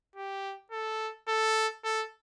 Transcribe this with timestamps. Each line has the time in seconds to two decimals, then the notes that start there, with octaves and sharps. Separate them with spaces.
0.16 G4
0.71 A4
1.28 A4
1.84 A4